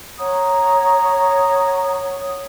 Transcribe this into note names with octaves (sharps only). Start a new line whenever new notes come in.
C#5 F#5 A#5 D#6